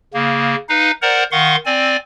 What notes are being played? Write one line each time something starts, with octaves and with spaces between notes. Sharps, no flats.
C#3 A#3
D#4 B4 F5
A#4 C5 D5 F#5 A#5
D#3 F5 F#5 C6 C#6
C4 D5 G#5